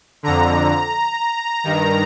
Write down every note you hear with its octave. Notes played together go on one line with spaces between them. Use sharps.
F2 D3 A#5
G2 D#3